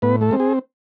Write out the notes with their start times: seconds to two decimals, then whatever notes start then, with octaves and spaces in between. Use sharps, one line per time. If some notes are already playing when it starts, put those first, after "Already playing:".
0.02 A2 B3 B4
0.21 A3 A4
0.31 G#3 C4
0.40 G#4